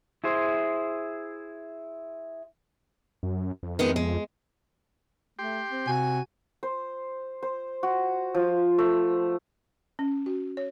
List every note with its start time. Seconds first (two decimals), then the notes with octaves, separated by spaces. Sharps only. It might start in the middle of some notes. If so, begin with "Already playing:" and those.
0.24 E4 G#4 C5
3.23 F#2
3.63 F2
3.79 D#3 G#3 B3
3.96 G#3
5.39 A3 G4 G5 C6
5.70 C4
5.87 C3 F#4 G#5
6.63 C5
7.43 C5
7.83 F#4
8.35 F3
8.78 A3
9.99 C#4
10.26 F#4
10.57 C#5